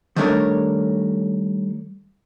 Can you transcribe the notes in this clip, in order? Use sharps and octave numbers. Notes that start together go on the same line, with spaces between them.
D#3 G3 A3 D4 A#4 C#5